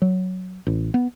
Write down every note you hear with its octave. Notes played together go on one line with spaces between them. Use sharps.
F#3
A1
B3